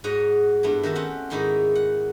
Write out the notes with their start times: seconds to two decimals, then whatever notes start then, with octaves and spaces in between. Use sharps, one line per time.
0.04 G#2 F#4 C#5 D#5 A#5
0.63 G2 A3 B3 E4
0.83 D#3 F#4 E5 A5
0.95 C4 C#4 F#5
1.30 G#2 D#3 D#4 E4 C#5 C6
1.75 F#5